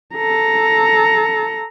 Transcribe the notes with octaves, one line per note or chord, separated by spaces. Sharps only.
A4 A#5